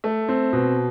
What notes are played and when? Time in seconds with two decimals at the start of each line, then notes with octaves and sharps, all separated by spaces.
0.04 A3
0.28 C4
0.53 B2